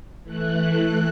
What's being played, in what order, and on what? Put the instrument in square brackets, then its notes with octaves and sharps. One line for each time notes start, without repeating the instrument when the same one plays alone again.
[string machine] E3 A3 F#6